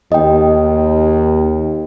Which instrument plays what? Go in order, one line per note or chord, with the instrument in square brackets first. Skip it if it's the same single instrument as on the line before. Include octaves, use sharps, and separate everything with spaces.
[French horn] D#2 [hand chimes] D#5 G5